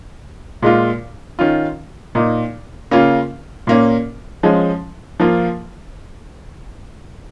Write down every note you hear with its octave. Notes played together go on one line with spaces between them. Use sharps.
A#2 G#3 F4
D#3 C#4 F4
A#2 A#3 D#4
C#3 A#3 C#4 F4
A#2 A#3 C#4
F3 G#3 C#4
F3 A#3 F4